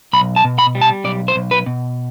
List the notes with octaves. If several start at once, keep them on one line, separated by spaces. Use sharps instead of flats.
B1 B5
A5
B2
B5
G3
A5
B1 D5
C5
B1
B4
B2